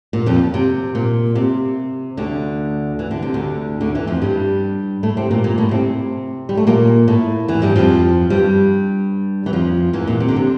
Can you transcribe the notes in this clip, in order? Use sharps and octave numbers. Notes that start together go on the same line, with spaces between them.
A#2
F2 F3
C3
A#2
C3
D2 D3
E3
D3
C3
D2 D3
D2 D3
E2 E3
F2 F3
G2 G3
A2 A3
C3 C4
A#2 A#3
A#2 A#3
A2 A3
C3 C4
G3
A3
A#2 A#3
A2 A3
E2 E3
G2 G3
F2 F3
G2 G3
E3
F2 F3
E2 E3
A#2
C3
D3
C3